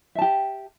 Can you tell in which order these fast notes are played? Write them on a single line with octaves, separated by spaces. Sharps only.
E5 A5 G4